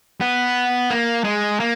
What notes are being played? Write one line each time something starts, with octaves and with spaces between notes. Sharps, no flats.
B3
A#3
G#3
A#3